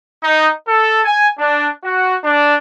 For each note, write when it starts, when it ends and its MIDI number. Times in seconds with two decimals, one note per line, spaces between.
0.22 0.49 63
0.66 1.01 69
1.04 1.27 80
1.38 1.68 62
1.84 2.16 66
2.24 2.56 62